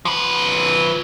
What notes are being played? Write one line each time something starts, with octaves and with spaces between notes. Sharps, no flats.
F3 B4